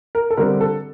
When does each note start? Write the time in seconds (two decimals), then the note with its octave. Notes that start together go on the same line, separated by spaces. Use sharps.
0.15 A#4
0.31 A4
0.37 D3 G3 C4 A#4
0.61 A4